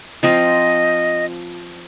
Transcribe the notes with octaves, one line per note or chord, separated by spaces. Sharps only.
F3 C4 F4 D#5